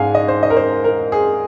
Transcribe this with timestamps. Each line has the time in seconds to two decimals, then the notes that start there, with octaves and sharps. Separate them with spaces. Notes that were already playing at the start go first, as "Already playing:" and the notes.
Already playing: G#2 G#3 F5 G#5
0.15 D#5
0.28 C5
0.43 D#5
0.50 A#4
0.57 C5
0.84 A#4
1.12 G#4